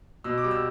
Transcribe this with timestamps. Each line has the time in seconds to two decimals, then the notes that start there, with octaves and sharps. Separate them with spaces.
0.24 B2 E6
0.38 D6
0.44 G3
0.51 E6